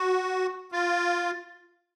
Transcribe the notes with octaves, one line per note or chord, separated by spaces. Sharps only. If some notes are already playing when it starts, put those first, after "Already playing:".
Already playing: F#4
F4